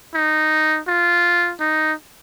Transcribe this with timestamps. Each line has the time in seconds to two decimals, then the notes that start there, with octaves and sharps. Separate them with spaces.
0.14 D#4
0.87 F4
1.60 D#4